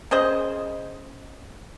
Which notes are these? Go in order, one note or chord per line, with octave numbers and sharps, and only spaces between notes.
C#3 G#4 C5 D#5